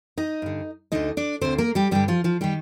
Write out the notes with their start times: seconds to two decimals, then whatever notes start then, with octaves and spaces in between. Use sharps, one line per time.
0.17 D#4 D#5
0.42 G2 D3
0.92 D2 D3 D#4 D#5
1.17 D4 D5
1.41 D2 D3 C4 C5
1.58 A#3 A#4
1.75 G3 G4
1.91 G2 D3 G3 G4
2.08 F3 F4
2.24 F3 F4
2.41 D#3 G3 G4